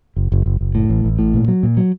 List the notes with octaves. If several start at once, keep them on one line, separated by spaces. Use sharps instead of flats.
F#1
F#1
F#1
F#1
A2
A1
A1
A2
A#2
F#3
A#2
F#3